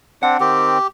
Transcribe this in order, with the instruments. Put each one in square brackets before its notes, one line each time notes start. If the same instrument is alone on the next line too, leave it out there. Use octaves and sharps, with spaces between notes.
[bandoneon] C4 D4 [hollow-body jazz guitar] F#5
[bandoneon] D#3 C4 [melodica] G4